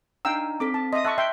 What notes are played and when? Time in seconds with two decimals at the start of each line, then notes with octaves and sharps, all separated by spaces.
0.25 D4 D#4 F5 G5 A#5 E6
0.60 C4 A4 D6 B6
0.74 A5
0.93 D#5 E5 C6 D#6
1.05 E5 A5 C#6 F#6
1.18 E5 G5 C6